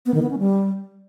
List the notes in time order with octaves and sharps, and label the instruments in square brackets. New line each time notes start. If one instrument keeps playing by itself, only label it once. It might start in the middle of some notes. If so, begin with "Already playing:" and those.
[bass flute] B3
D#3
B3
C#4
G3